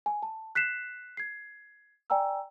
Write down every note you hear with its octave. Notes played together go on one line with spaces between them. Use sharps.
G#5
A5
F#6 B6 C7 E7
G#6 C7
D5 G5 G#5 A#5 E6